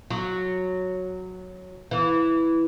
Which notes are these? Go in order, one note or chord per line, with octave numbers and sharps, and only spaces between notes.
F#3
E3